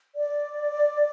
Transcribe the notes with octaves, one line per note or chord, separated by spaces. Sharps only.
D5